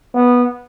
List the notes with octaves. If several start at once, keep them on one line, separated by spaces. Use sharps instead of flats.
B3